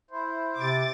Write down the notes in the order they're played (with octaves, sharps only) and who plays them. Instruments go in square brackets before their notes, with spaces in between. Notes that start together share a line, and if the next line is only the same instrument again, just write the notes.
[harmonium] E4 C5
[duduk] C3 [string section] D6 A6